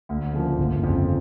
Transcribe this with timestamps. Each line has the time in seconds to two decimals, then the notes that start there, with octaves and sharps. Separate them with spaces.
0.09 D2
0.33 C#3 F3 A#3
0.58 G1
0.83 F2 C#3